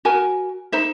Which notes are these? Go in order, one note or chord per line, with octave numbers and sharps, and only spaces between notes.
F#4 A#4 G#5
D#4 C5 E5